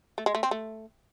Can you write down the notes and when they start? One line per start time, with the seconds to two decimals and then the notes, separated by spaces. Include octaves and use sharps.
0.18 A3
0.26 G#3
0.35 A3
0.43 C4
0.51 A3